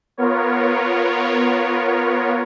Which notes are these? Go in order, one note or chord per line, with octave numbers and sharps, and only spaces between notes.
B3 F4 A#4 C#5